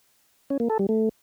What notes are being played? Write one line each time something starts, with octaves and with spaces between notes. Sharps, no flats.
C#4
A#3
A4
G3
A3